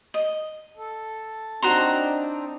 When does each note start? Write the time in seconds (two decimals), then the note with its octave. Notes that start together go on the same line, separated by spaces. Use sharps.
0.14 D#5
0.77 A4
1.62 C4 D4 D#4 F#4 A#5 C6